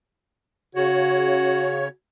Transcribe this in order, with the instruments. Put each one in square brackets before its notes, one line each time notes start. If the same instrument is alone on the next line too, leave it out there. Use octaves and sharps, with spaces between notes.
[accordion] C#3 C#5 [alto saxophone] F#4